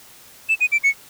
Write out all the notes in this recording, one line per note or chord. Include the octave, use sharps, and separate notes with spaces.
E7
D#7
D7
C#7